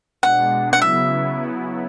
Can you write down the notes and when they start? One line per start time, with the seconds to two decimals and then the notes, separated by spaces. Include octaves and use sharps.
0.22 B2 G#3 D4 F#5
0.73 F#5
0.81 C#3 F#3 B3 E4 E5